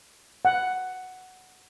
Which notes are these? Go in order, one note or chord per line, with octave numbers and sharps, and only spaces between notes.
F#5